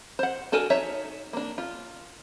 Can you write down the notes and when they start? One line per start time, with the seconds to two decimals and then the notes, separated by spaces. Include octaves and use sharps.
0.19 C5 F#5
0.52 D4 F#4 A4 A#4 G#5
0.70 D#4 C#5 E5
1.33 A#3 D4
1.58 F4